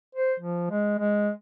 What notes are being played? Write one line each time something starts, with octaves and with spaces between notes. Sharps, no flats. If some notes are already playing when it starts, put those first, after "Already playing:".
C5
F3
G#3
G#3